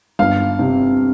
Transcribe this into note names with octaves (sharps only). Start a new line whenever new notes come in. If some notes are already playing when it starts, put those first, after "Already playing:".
G1 F5
C3